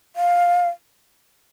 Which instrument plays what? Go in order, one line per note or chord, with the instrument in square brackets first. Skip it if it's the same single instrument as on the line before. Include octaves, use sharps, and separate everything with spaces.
[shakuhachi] F5